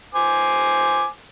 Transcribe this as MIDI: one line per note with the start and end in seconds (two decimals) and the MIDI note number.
0.15 1.06 72
0.15 1.06 80
0.15 1.06 86